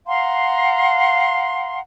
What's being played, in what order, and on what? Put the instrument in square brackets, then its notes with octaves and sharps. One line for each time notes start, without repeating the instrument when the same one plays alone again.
[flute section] F5 F#5 A#5 C6